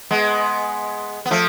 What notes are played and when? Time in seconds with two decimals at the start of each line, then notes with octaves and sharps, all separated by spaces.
0.11 G#3 B3
1.25 B3
1.31 F3 A3